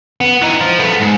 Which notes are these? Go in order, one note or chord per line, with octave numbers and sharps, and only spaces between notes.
B3
E3 D#4
F3
A3 B3
G#2